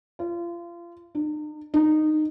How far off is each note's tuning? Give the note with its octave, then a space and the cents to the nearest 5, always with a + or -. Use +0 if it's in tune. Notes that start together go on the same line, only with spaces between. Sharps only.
F4 -30
D#4 -45
D#4 -15